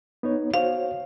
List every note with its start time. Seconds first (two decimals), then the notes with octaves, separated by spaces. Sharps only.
0.23 B3 D#4 C#5
0.54 F#4 C5 C#5 F5